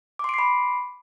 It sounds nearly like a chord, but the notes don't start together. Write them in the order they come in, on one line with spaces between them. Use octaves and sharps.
D6 C6 D7 C7 B5